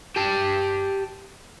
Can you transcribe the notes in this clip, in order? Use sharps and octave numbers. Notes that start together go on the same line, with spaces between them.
G4 A5